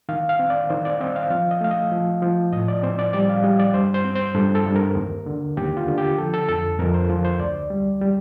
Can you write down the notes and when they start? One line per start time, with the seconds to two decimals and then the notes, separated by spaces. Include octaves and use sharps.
0.09 D#3 F5
0.29 F5
0.39 C4
0.50 D5
0.70 D#3 C5
0.85 D5
1.00 C4 D#5
1.16 F5
1.30 F3 F5
1.51 D#5
1.61 A3 F5
1.71 D#5
1.92 F3
2.22 F3
2.52 A2 D#5
2.68 D5
2.83 C4 C5
2.99 D5
3.13 G3 D5
3.29 F5
3.43 G3 D#5
3.60 D5
3.74 G2 C5
3.94 C5
4.04 C4
4.15 C5
4.35 G2 A4
4.55 A4
4.66 G2
4.76 A#4
4.96 D#2
5.26 D3
5.57 D#2 G4
5.77 F4
5.88 D3
5.98 G4
6.18 F3 A4
6.34 A4
6.49 F2 A4
6.79 F2 A#4
6.94 C5
7.09 F3
7.25 C5
7.39 D2 D5
7.70 G3
8.01 G3